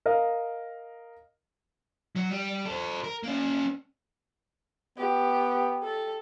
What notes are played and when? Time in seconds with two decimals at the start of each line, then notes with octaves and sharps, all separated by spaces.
0.06 A#4 D#5 F5
2.16 F#3
2.30 G3
2.65 A4 C5
3.04 A#4
3.23 A#3 C#4
4.98 B3 G4
5.84 A4